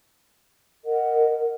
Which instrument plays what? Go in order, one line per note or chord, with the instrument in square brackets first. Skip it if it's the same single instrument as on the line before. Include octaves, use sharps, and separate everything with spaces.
[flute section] A#4 D#5 F#5